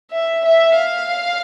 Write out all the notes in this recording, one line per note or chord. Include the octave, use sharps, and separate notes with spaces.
E5
E5
F5